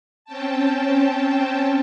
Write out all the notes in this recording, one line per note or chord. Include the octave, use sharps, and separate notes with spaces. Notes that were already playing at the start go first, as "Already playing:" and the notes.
C4 C#4 G5 A5